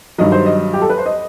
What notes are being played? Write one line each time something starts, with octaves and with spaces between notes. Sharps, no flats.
G2 D#3 F#3 D#5
C5
D#5
G4
A4
B4
C5
D#5